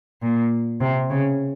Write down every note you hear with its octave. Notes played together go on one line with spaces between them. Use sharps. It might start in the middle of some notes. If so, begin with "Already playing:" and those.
A#2
C3
C#3